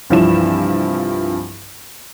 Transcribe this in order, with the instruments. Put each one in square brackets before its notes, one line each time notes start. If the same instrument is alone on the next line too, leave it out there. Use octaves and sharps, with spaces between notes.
[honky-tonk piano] C2 G2 E3 F3 E4 E7